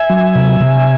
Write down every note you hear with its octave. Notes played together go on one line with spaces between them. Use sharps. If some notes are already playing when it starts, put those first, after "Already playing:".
Already playing: E5 G#5
F#3
C3
C3